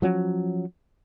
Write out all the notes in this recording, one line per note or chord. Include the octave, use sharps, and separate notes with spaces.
F3 F#3 C#4